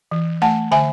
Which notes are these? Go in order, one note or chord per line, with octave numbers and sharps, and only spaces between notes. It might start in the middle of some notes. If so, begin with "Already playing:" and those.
E3
A3 F#5 A5
D3 E5 G#5